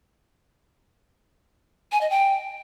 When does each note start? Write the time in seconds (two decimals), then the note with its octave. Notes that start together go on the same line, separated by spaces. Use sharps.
1.92 G#5
2.01 D#5
2.10 G5